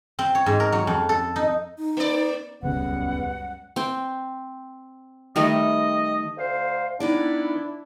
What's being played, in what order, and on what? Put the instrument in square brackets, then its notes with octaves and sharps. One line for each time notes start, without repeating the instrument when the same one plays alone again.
[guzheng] C4
C#5
G#2
A#4
F#3
F2
A4
D#4
[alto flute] D#4
[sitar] A#3 D5
[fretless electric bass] D#1 C#3 C#4 [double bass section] C#2 F#2 G3 [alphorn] B3 [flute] F#5
[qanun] C4 G5
[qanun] D#3 G3 A3 [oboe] D#5
[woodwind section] D2 C5 F5
[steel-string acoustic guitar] D#3 B3 D5 [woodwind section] D4 E4